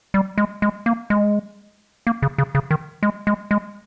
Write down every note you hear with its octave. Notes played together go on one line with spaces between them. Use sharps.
G3
G#3
G#3
A#3
G#3
A#3
C#3
C#3
C#3
D#3
G#3
G#3
G#3